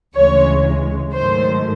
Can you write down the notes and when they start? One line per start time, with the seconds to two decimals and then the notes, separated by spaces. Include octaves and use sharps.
0.14 D2 C#3 E3 G#3 C#5
1.12 G#2 D#3 F#3 A3 C5